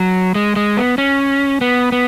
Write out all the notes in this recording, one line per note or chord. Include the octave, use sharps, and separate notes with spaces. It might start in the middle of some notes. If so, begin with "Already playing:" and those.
Already playing: F#3
G#3
G#3
B3
C#4
B3
B3